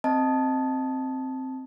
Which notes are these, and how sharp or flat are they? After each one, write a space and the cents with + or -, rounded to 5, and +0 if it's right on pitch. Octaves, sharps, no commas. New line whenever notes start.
C4 +0 D#5 +0 A5 +0